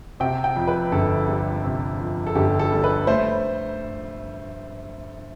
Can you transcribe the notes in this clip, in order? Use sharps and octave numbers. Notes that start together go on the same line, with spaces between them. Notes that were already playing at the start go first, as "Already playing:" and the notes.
C3 G5
G5
F2
B4
G1 A4
G3
C3
F2
A4
G1 G4
A4
G3
B4
A3 C5